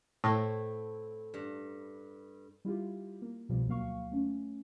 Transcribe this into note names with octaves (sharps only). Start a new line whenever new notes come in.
A2 A3 C4 E4
G2
G3 E4 F4 G4
A#3
C2 B2 F3 G3
D2 F#3 A#3 F5 C#6
A3 C#4